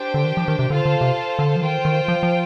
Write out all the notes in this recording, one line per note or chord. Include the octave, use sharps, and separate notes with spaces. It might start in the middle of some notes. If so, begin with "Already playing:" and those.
Already playing: D4 G4 C5 G5
D3
D#3
F3
D#3
C3
D3 F4 A4 C5 F5 A5
D3
C3
D3
F3
D#3 F4 C5 G5
D#3
F3
F3